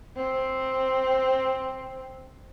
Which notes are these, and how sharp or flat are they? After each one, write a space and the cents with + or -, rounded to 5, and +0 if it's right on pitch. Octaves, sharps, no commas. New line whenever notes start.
C4 +5